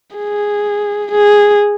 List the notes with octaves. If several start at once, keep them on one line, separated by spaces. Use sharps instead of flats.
G#4
G#4